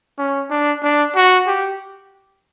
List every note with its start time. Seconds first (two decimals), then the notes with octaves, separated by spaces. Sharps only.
0.18 C#4
0.50 D4
0.82 D4
1.16 F#4
1.47 G4